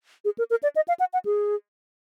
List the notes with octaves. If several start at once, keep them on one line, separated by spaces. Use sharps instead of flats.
G#4
A#4
A#4
D5
D#5
F5
F#5
F#5
G#4